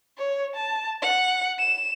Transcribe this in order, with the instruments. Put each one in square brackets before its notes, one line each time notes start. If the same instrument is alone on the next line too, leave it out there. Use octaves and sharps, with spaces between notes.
[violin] C#5
A5
F#5
E7